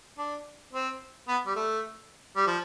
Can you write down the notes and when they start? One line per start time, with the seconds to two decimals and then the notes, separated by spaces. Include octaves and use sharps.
0.18 D4
0.73 C4
1.28 B3
1.46 G3
1.56 A3
2.36 G3
2.47 F3